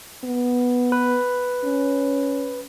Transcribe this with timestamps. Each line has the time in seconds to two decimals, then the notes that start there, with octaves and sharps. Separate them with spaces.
0.24 B3
0.92 B4
1.64 C#4